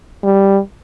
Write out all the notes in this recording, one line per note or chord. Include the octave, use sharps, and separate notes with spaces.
G3